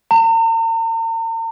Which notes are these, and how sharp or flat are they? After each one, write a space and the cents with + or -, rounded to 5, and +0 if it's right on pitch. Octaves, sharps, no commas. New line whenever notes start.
A#5 -45